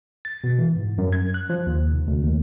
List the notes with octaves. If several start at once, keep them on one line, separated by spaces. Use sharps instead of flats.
A6
B2
E3
G#2
F#2
G#6
F#6
F3
D#2
C3
D2
D#2